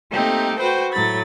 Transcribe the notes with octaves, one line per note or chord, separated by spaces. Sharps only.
A3 A#3 C4 D#4 G4
F#4 B4 C5 G5
A2 F#3 B5 A6